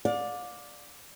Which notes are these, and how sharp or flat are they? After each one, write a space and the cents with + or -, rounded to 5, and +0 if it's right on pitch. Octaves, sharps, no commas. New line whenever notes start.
D5 +0 F5 +40